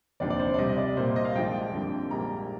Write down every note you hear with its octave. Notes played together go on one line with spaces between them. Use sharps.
F1 D#2 D3 F3 D5
D5
C5
D5
C2 C3 G3 D#5
D#5
D5
C2 A#2 G3 A#3 C5
C5
D#5
F5
A#1 G#2 F3 G5
F2 D3 G3 A#3
A#1 G#2 G3 A#3 A#5